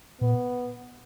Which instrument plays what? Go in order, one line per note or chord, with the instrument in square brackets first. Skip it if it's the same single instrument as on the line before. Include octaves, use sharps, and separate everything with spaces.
[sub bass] A#2 [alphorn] B3